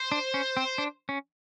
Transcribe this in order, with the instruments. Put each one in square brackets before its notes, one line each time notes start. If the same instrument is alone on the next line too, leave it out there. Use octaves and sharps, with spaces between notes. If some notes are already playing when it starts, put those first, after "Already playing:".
Already playing: [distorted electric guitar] C5
[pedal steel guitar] D4
C#4
C4
D4
C#4